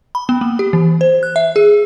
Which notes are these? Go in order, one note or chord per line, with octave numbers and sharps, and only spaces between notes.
B5
B3
A#3
G4
E3
C5
F#6
E5
G#4